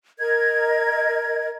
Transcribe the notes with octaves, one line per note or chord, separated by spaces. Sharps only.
A#4 D#5 G#6